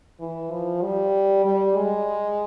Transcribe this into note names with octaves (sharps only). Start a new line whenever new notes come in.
E3
F3
G3
G3
G#3